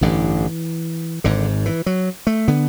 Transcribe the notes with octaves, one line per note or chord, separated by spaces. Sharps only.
A1 G2 D3 E3
G#1 G#2 D3
E3
F#3
A3
D3 B3